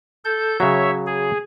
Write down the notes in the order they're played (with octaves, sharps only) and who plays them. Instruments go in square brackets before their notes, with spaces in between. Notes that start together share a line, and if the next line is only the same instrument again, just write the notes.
[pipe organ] A4 G6
[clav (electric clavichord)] C#3 F#3 [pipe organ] C#5 E5
[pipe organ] G#4